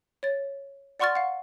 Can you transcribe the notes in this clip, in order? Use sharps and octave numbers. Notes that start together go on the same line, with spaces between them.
C#5 A6
D5 F#5 C6 C#6 F6 A6
F5 F#5